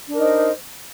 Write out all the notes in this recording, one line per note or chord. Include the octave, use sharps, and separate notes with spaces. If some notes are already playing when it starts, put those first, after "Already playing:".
D4 D#4 A#4 C5